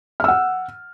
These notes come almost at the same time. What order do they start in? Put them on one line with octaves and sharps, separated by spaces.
F6 E6 F#5